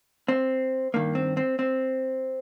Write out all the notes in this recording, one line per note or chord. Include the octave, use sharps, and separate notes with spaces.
C4
G2 D#3 A#3
C4
C4
C4